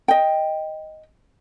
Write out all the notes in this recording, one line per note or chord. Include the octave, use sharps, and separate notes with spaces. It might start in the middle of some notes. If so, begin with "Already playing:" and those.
D#5 G5